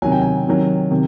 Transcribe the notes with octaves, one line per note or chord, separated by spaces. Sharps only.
C3 D#3 F#3 G#5
G5
G#5
C3 D#3 F#3
C3 D#3